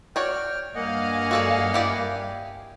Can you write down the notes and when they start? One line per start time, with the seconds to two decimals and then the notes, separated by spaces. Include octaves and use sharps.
0.16 F#4 C#5 D5 G5 F6
0.75 G2 A#3 D#5 F5 F#5 G#5
1.31 F#4 A4 D5
1.74 E4 G4 D5